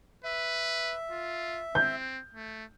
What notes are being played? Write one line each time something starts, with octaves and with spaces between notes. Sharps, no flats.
B4 E5
F4
C4 G6
A3